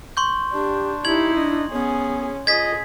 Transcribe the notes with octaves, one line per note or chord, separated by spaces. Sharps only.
C6 C#6 G6
D4 G4
D#4 E4 G4 G#6 F#7
D4 D#5
B3 C#4 G#4
F4 G#4 D#5 G#6 B6